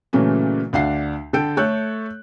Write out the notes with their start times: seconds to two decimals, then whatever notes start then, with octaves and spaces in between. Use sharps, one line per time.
0.13 A#2 C#3 E3 F#3 A3 C#4
0.73 D2 D4 F5 F#5 C7
1.33 D3 A4 G5 G6 D7
1.57 A3 A4 C#5 F#6 G6